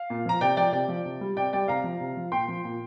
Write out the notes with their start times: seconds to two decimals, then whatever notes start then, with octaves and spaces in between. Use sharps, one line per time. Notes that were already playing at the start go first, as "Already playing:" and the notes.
Already playing: F5
0.10 A#2
0.25 F3 A#5
0.41 C3 D5 G5
0.57 F3 D5 G5
0.73 C3 D5 G5
0.88 F3
1.06 C3
1.21 G3
1.37 C3 D5 G5
1.53 G3 D5 G5
1.68 C3 F5 A#5
1.84 F3
2.01 C3
2.17 F3
2.32 A#2 G5 C6
2.48 F3
2.64 A#2